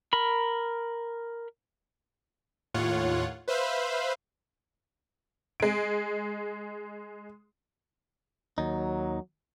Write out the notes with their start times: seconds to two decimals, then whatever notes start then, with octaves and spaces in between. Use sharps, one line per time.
0.13 A#4 B5
2.74 D#2 A2 F4 C#5 F#5
3.48 B4 C5 E5 F5 B5
5.60 G#3 D7
8.58 D#2 F#3 D#4